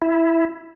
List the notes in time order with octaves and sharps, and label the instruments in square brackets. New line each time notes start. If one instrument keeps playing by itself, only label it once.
[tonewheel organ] E4